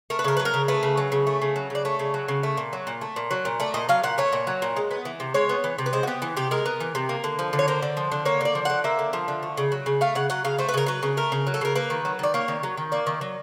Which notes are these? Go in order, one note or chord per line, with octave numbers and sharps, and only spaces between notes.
A3 A#4
B4
C#3 A#4
F#3 B4
A#4
C#3
A3 B4
C#3
F#3
C#3
A3
C#3
F#3
C#3 D5
A3 C#5
C#3
F#3
C#3
A3
A#2
F#3
A#2
A3
A#2
F#3
A#2
A3 D5
A#2 D#5
F#3 F5
A#2 F#5
A3 C#5
A#2
F#3
A#2
G#3
B3
E3
C3
G#3 C#5
B3
E3
C3
B4
G#3 C5
F#4
B3 G4
E3
C3 G4
G#3 A#4
B3
E3
C3
A#3
D3
F3
D3
C#5
A#3 C5
D3
F3
D3
A#3 C#5
D3 D5
F3
D3 F#5
A#3 E5
D3
F3
D3
A3
C#3
F#3
C#3
A3 F5
C#3 F#5
F#3 F#5
C#3 F5
A3 C5
B4
C#3 A#4
F#3 B4
C#3
A3 A#4
C#3
F#3
A4
C#3 A#4
A#3 B4
D#3
F#3
D#3 D5
A#3 C#5
D#3
F#3
D#3
A#3 D5
D#3
F#3